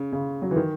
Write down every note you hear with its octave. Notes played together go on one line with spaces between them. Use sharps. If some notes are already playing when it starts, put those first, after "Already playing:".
Already playing: C#3
C#3
F#3
E3
D#3